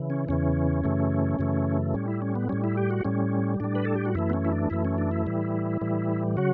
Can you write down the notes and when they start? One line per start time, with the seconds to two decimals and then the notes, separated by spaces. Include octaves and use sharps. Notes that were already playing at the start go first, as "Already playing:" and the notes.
Already playing: C#3 E3
0.10 C#4
0.29 E2 C#3 E3 C#4
0.84 F#2 C#3 E3 A3
1.39 F#2 C#3 E3 A3
1.94 A2 G3 C#4
2.08 E4
2.22 C#4
2.35 B3
2.49 A2 G3 C#4
2.64 E4
2.77 G4
2.91 F#4
3.05 A2 G3 C#4
3.60 A2 G3 D4
3.75 B4
3.85 A4
3.95 G4
4.05 F#4
4.15 F#2 E3 A3 E4
4.30 B3
4.33 C#4
4.45 E4
4.53 D4
4.70 F#2 E3 A3 E4
4.85 C#4
4.98 D4
5.11 E4
5.26 A2 E3 G3
5.81 A2 E3 G3
6.37 C#3 F#3 F#4